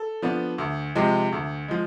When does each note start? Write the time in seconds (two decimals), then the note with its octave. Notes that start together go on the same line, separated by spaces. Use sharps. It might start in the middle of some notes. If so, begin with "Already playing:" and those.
Already playing: A4
0.22 F3 B3 D4
0.58 D2
0.95 C3 F3 G#3
1.33 D2
1.68 F3 G#3